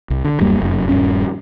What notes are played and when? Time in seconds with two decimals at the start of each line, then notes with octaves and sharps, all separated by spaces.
0.10 C2
0.24 D3
0.40 D1 F#2 G3 A#3
0.61 F1 F#2
0.89 D#1 G#1 G2 C#4